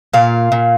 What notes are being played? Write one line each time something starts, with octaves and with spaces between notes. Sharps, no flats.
A#2 F5
A#2